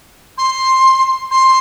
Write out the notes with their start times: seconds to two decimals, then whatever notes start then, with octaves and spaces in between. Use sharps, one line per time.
0.38 C6
1.31 C6